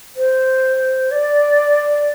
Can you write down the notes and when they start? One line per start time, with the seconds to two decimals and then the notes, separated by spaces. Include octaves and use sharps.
0.16 C5
1.11 D5